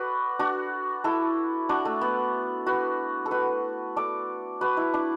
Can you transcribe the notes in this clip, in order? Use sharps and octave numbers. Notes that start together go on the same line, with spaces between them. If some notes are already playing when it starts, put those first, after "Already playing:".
Already playing: F#4 A4 B4 D5
D4 F#4
E4 A4
D4 F#4
A3
B3
F#4 B4
A4
F#4 B4
A4 D5
F#4 B4
E4
D4